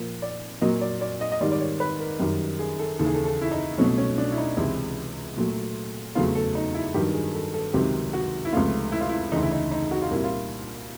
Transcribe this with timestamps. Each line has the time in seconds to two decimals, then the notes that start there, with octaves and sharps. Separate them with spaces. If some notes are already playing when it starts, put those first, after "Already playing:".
Already playing: A#2 F3 A#3
0.22 D5
0.61 A#2 F#3 A#3 D#5
0.81 D5
1.01 D5
1.21 D#5
1.32 D#5
1.41 G#2 D#3 G3 D5
1.52 D5
1.61 C#5
1.80 B4
2.00 A#4
2.20 F#2 D#3 G3 G4
2.59 G#4
2.79 A4
2.99 D#2 C#3 E3 A4
3.07 G#4
3.15 A4
3.25 A4
3.41 E4
3.51 D#4
3.78 C2 B2 F#3 A3 C#4
3.98 C#4
4.18 D4
4.32 E4
4.38 D#4
4.57 C#2 C3 E3 G#3 E4
5.36 A#2 F#3 A3
6.15 E2 C#3 F#3 A3 F4
6.35 A4
6.55 D#4
6.75 E4
6.94 G2 D#3 F#3 G4
7.14 G#4
7.34 A4
7.54 A4
7.73 C#2 C3 D#3 F#3 G4
8.13 F#4
8.45 E4
8.53 C#2 C3 F3 A3 F4
8.92 E4
9.01 F4
9.09 E4
9.32 D2 C#3 E3 D#4
9.42 E4
9.52 D#4
9.71 D#4
9.91 F#4
10.02 F4
10.11 C2 A#2 G3 A#3 E4
10.24 F4